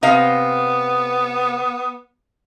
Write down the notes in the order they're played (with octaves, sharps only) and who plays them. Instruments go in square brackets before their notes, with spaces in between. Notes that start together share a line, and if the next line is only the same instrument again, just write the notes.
[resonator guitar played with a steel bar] C3 D#5 F5 [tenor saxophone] B3